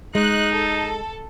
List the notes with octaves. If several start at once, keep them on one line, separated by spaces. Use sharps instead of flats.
G#3 D#4 F#6
A4